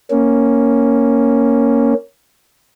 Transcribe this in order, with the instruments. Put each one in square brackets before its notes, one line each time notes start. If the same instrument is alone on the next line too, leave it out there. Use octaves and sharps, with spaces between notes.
[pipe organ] A#3 C#4